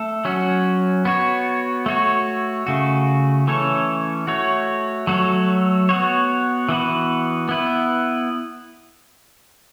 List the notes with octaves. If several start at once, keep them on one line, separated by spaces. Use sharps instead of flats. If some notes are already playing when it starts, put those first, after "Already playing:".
Already playing: A3 A4
F#3 C#4 F#4
B3 F#4 C#5
A3 F#4 C#5
C#3 A3 F#4
E3 A3 C#4 A4 C#5
A3 F#4 C#5
F#3 A3 F#4 A4 C#5
B3 F#4 C#5
E3 B3 F#4 B4
B3 E4 B4